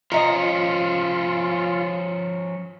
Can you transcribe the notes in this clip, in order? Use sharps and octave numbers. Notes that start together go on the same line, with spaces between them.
F3 C#4 F4 D#5 E5 A#5